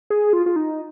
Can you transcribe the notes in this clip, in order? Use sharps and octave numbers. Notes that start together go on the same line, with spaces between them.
G#4
F4
F4
D#4